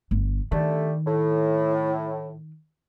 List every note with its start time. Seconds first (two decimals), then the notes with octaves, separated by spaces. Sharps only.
0.11 G1
0.52 D3 D#3 G3 A3
1.06 A2